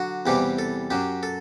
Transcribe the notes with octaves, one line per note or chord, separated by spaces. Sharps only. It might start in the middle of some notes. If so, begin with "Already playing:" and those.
Already playing: D3 F#3 F#4
E2 C3 E3 G3 G4
A4
F#2 F#3 G4
A4